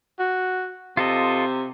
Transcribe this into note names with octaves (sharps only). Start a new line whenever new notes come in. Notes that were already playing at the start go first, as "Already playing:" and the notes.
F#4
C3 F4 A4 D#5